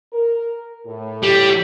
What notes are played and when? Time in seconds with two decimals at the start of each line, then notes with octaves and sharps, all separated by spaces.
0.13 A#4
0.86 A2
1.23 G3